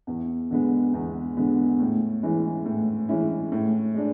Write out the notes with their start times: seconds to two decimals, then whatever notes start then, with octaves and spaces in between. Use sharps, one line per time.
0.07 E2
0.51 D3 G#3 B3
0.94 E2
1.37 D3 G#3 B3
1.79 A2
2.23 E3 G#3 C#4 E4
2.66 A2
3.09 E3 G#3 C#4 E4
3.52 A2
3.94 G#3 D4